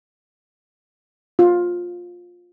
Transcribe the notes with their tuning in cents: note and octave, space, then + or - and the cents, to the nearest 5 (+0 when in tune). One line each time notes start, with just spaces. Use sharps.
F4 +15